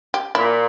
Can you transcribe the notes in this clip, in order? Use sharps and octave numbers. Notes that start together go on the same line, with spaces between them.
G4
A#2 E4